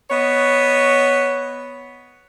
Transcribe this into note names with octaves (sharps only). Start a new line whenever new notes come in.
B3 C#5 D#5